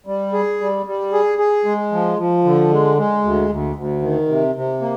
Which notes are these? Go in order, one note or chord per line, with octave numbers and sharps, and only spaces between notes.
G3
G#4
G3
G3
G#4
G#4
G#3
F3
F3
D3
G#3
G#3
D2
D2
D2
D#3
C3
C3
A#3